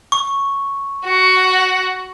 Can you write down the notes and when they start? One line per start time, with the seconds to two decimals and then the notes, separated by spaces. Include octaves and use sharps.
0.12 C#6
1.05 F#4 F#5